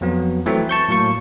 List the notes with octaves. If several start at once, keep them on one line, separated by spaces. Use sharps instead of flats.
F2 F#3 B3
E3 F#3 A3 C4
A5 C#6 G6
A2 F#3 A#3 C#6